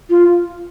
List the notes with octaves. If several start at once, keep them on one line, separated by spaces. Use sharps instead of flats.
F4